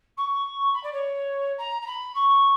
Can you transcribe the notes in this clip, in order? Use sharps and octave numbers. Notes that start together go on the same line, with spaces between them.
C#6
B5
D5
C#5
A#5
A#5
B5
C#6